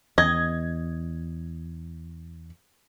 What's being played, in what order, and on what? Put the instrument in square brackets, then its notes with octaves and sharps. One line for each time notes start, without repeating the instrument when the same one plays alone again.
[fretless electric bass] E2 [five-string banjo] D#5 [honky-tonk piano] G#6